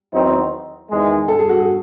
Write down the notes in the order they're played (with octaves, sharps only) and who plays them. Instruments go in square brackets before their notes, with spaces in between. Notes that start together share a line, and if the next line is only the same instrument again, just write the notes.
[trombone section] E2 D#3 F#3 C4 D#4
E2 D#3 G#3
[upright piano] A4
G#4
F#4
G#4